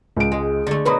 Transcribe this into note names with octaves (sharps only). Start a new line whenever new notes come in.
C#2 D7
G#3
D3 A3
B2 F#3 D#4 B4 B5